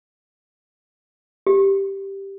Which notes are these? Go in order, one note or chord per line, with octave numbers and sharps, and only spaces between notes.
G4